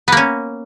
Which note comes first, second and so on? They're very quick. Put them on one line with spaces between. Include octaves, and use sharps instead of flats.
B3 A#3 C#4